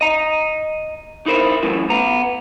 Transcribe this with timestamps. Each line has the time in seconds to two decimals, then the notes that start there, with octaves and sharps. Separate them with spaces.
0.01 D#5 A#5
1.26 D#4 E4 A#4 C5
1.63 F#2 A2 E3
1.90 B3 A#5